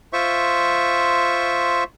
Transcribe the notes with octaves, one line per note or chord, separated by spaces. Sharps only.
F4 C5 E5 C#6